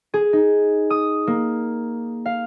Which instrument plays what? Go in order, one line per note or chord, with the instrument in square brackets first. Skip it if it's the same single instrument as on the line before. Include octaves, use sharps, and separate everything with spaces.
[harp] G#4
D#4
D#6
A#3
F5